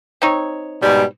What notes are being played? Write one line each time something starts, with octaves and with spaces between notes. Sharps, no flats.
C4 D#4 C#5
G#2 B2 G3